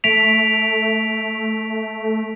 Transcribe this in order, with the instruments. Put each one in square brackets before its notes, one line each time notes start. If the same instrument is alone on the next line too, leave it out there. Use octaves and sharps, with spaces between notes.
[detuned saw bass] A3 [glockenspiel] B6 D7 F7